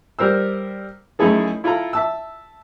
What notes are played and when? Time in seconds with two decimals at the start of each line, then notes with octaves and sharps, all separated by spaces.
0.19 G3 A#4 C5 E6
1.19 F#2 A3 D#4 E4 G#4 A4
1.64 E4 F4 A4 A#5
1.93 E5 A5 E6